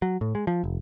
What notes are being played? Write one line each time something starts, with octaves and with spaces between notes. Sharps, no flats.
F#3
A2
G#3
F3
F1